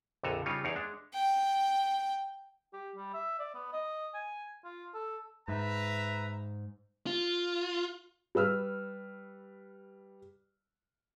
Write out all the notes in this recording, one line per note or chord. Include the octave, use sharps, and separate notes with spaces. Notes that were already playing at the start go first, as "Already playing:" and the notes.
A#1 F2 D3 A4 G#5 A#5
C#3 G3 D#4 F4 C#5
E2 D#4 C#5 D5 F5
G#3 D4
G5
G4
G3
E5
D5
B3
D#5
G#5
F4
A4
G#2 B4 E5 A#5
F4
G3 B4 E6 F6